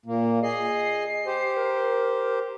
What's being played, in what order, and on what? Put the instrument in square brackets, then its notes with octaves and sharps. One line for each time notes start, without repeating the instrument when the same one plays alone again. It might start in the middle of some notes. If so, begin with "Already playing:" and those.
[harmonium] A#2 A#3
[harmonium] G#4 D#5 [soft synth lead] C7
[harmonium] G4 C5
[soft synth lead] A#4